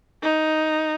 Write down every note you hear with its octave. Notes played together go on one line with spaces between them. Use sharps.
D#4